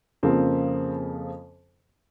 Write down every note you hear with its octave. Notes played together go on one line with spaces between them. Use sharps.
F2 C#3 F3 A#3 C4